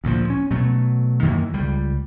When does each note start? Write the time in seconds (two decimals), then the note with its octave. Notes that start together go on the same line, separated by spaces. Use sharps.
0.04 D2 A#2 F3
0.30 C#4
0.51 B2 F#3 A3
1.22 F#2 D#3 E3 A#3
1.53 C#2 G3